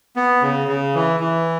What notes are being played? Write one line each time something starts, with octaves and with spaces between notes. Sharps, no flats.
B3
C#3
C#3
E3
E3